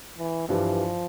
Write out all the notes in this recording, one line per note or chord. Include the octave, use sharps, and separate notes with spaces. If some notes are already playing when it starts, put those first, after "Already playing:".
E3
G2 E3 F3 G3